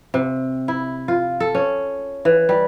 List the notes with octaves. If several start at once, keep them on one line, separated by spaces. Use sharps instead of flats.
C3
E4
F4
A4
C#4
E3
G3